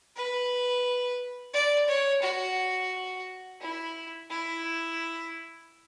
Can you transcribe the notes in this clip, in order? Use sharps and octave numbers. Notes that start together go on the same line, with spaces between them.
B4
D5
C#5
F#4
E4
E4